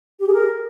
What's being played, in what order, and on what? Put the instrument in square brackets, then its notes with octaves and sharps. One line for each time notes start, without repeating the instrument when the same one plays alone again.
[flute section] G4
G#4
A#4